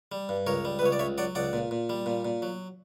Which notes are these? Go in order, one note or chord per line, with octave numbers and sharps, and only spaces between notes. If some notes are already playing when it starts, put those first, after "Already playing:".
G3
G2
C#2 A#4 C#5
G3
B4
C#2 C#5
D5
C#2 C#5 E5
F#3 D5 F#5
C#2 D5 F#5
A#2
A#2
G3
A#2
A#2
F#3